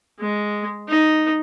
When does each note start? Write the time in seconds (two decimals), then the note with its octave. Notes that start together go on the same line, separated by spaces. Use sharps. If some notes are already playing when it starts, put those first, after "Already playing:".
0.20 G#3
0.89 D#4